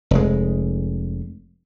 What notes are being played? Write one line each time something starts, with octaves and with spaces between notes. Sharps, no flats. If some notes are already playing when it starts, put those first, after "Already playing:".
F1 G#3